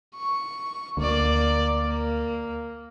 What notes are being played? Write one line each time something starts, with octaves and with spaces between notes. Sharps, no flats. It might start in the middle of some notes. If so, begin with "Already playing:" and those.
C#6
D2 A#3 D5
A#3